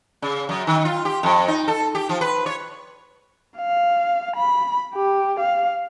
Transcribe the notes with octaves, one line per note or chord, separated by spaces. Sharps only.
C#3
F#2
D#3
F4
G4
F2
D#4
A4
G4
F3
B4
C#5
F5
B5
G4
F5